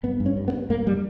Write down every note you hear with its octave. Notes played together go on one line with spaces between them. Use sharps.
G2 B3
G2
C#4
G2
B3
G2
G2 A#3
G3